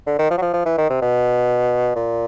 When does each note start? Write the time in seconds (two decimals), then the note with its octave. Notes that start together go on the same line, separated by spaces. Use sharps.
0.07 D3
0.19 D#3
0.31 F3
0.38 F#3
0.42 F3
0.54 F3
0.66 E3
0.78 D#3
0.90 C3
1.02 B2
1.96 A#2